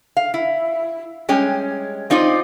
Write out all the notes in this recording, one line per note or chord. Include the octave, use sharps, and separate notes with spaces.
F5
E4
G3 G#3 C#4 G5
C4 D#4 F4 C5 D5